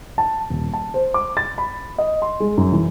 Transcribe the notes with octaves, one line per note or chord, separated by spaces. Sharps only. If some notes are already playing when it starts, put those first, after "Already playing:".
A5
D#1
A5
C5
D6
A6
B5
D#5
C6
G#3
F#2
E3